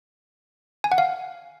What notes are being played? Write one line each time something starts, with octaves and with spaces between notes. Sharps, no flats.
G#5
F#5
F5